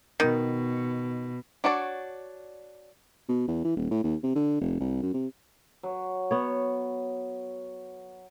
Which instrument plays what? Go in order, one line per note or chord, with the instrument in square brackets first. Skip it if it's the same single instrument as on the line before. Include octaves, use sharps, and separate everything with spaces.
[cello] B2 [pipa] D#3
[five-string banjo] D4 F#4 C#5 D5
[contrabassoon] B2
E2
E3
D#1
A2
D#2
C3
D3
F1
C2
F#2
C3
[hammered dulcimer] F#3
[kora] B3 C#5